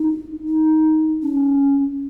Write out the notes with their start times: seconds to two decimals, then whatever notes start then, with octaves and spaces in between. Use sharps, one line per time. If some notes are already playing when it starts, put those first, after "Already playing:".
Already playing: D#4
0.48 D#4
1.23 C#4